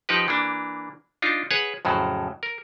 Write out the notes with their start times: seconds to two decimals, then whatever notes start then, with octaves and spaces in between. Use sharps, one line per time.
0.09 F3 D#4 G4 B4
0.28 E3 A#3 D4
1.22 D4 D#4 F4
1.51 G#4 B4 C#5 F#5
1.85 F2 A2 C#3 F#3
2.43 A#4